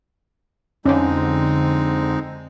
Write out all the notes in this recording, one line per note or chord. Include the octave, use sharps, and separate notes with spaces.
F2 D3 G#3 C4 C#4 D#4